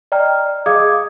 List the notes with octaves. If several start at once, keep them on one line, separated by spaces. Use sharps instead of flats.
D5 D#5 G5 A#5 F6
G#4 D#5 F5 D6 D#6 G#6